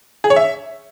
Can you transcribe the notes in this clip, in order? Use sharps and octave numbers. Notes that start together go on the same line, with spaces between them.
G#4
C#5
E5